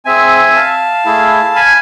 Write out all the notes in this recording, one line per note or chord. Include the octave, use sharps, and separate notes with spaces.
C4 G#4 E5 G#5
F5 A5
A3 E4 G#4
G#5 B5